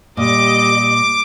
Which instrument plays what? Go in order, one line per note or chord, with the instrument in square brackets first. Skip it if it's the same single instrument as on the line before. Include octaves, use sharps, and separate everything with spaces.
[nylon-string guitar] A#2 [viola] G3 D#5 [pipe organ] D6